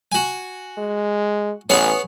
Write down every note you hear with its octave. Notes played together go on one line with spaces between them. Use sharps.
F#4 G#5
G#3
A1 B3 G#4 C#5